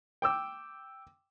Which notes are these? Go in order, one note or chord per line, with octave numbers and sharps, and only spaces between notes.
G5 D6 E6